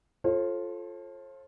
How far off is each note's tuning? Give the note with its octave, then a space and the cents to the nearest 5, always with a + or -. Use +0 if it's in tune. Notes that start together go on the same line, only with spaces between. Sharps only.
F4 +0 A4 -10 C5 +45